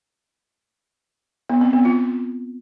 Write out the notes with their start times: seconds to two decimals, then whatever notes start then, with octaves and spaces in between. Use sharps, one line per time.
1.50 B3
1.61 C4
1.73 B3
1.85 F4